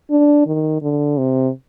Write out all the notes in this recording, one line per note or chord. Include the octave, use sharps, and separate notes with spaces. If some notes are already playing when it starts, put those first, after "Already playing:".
D4
D#3
D3
C3